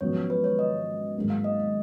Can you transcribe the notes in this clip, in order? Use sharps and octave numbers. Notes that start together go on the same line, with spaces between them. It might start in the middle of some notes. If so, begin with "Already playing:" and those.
G#1 F#2 F3 B3 F#4 C#5
B4
C#5
D#5
G#1 G#2 F#3 A#3
F5
D#5